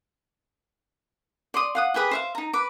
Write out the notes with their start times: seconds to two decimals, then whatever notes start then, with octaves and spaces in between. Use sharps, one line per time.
1.54 D5 C6 D#6
1.75 F5 F#5 D#6
1.94 G4 G#4 B4 D#6
2.11 C5 E5 F5
2.35 D#4 A#5
2.53 B4 D6